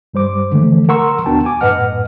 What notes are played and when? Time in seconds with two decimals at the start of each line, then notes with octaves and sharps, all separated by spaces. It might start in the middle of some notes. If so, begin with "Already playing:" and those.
0.14 G2 G3 C5 D6
0.52 D3 E3 F3 A3
0.89 A#4 F#5 A#5 C6 C#6 E6
1.26 D#2 B3 D4 F#4 G5 A5
1.45 G#5 D6
1.61 F#2 A2 B4 D#5 F#5 F6